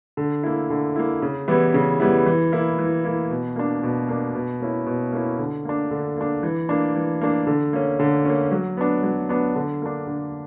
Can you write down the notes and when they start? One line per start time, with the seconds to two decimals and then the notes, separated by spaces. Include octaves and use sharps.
0.17 D3
0.43 A#3 E4
0.70 D3
0.96 A#3 E4
1.22 C#3
1.48 E3 G3 B3 E4
1.74 C#3
2.00 E3 G3 B3 E4
2.26 E3
2.52 A#3 E4
2.79 E3
3.05 A#3 E4
3.30 B2
3.56 A#3 D4
3.83 B2
4.08 A#3 D4
4.35 B2
4.60 A#3 C#4 E4
4.86 B2
5.13 A#3 C#4 E4
5.39 D3
5.65 A#3 D4
5.91 D3
6.17 A#3 D4
6.43 E3
6.69 A#3 D4
6.95 E3
7.21 A#3 D4
7.47 D3
7.73 A#3 C#4
7.99 D3
8.25 A#3 C#4
8.52 F#3
8.77 B3 D4
9.03 F#3
9.29 B3 D4
9.56 D3
9.82 A#3 D4
10.07 D3